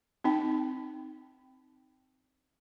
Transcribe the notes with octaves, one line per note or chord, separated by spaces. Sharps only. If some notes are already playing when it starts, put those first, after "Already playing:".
C4 D#4 G5